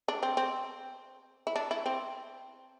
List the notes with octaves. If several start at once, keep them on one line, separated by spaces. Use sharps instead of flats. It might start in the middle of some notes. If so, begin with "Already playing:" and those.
D4
C4
C4
E4
D4
E4
C4